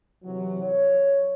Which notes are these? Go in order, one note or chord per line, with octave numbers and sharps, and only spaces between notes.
C3 E3 F#3
C#5